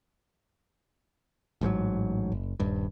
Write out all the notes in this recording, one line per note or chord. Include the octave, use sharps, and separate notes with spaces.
A1 G#2 C#3 F#3
F#1
D#1 G2